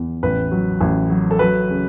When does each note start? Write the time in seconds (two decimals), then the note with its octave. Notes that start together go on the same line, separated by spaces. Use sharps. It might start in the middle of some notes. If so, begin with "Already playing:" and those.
Already playing: E2
0.23 A1 B4
0.52 F#3
0.81 A1
1.10 F#3
1.31 A4
1.39 F#3 B4
1.69 C#3